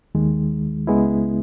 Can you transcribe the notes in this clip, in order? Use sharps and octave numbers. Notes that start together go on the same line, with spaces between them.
D#2 D#3 G#3
C#2 C#3 G#3 B3 E4